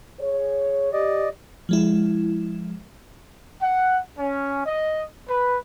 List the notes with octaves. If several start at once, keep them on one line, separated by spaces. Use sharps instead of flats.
G#4 C#5
G4 D5 D#5
F3 G#3 E4
F#5
C#4
D#5
B4